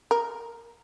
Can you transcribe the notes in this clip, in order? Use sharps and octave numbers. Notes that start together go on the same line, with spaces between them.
A#4